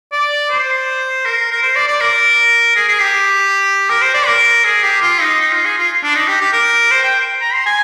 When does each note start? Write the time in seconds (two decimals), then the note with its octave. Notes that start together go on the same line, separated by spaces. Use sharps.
0.12 D5
0.50 C5
1.25 A#4
1.51 A#4
1.62 C5
1.75 D5
1.88 D5
2.01 A#4
2.76 G#4
2.88 G#4
3.01 G4
3.90 A#4
4.02 C5
4.14 D5
4.27 A#4
4.64 G#4
4.83 G4
5.02 F4
5.21 D#4
5.40 D#4
5.52 F4
5.65 G#4
5.78 F4
6.03 D4
6.16 D#4
6.28 G4
6.41 G4
6.53 A#4
6.91 C5
7.03 G5
7.41 A#5
7.53 C6
7.66 G#5